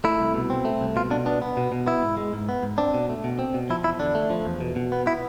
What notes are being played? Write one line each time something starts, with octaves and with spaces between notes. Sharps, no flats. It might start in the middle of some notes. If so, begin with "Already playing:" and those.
A3 E4
C2
B2
C4
A3
C2
B2 F4
B2 D4
B3 D4
B3
B2
B2
B3 E4
G#2
G#3
G#2
B3
G#2
C4 D4
B2
A3
B2
C4
B2
F3 E4
E2 E4
D3 D4
A3
F3
E2
B2
B2
B3
B3 E4